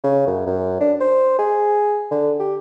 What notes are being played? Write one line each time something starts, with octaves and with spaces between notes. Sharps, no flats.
C#3
F#2
F#2
D4
C5
G#4
D3
G4